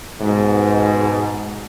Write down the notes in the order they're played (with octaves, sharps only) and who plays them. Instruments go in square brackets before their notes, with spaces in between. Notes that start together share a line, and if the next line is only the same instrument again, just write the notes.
[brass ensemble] G#2 B2